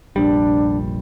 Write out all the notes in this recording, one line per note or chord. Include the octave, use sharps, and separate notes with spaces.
F1 A#1 G3 D4